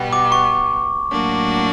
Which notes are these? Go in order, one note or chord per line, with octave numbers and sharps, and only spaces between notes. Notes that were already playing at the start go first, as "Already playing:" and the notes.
Already playing: B2 G3 B3
D6
C#6
A2 F#3 A#3 D4 F#4